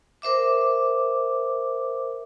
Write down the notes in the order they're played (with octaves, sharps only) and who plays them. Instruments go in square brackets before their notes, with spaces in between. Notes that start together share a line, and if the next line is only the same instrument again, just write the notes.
[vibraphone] A#4 C5 E5 D6